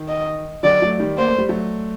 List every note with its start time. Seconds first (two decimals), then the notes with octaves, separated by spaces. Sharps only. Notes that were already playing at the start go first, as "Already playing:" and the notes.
Already playing: D#3
0.08 D#5
0.63 D3 F#3 D5
0.82 F#3 A3
1.00 D#3 G3
1.18 A#3 C5
1.28 A3
1.38 G3
1.49 F#3 A3